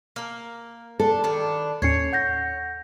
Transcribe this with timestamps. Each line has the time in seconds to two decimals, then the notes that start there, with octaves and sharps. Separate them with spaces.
0.16 A#3 A#4 F6
1.00 D4 A4
1.24 D#3 E3 D4
1.82 D#2 A2 C#4 C#5 G#6 C7 C#7
2.12 F#5 G6 A#6